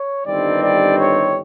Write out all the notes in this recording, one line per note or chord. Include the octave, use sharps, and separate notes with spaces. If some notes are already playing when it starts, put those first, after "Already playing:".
Already playing: C#5
G1 G2 D#3 G3 C4 D5
D5
C#5